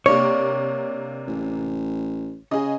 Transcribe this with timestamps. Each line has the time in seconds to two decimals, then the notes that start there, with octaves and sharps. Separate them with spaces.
0.06 C3 A#3 D4 C#5
1.27 A1
2.51 C#3 G#4 D#5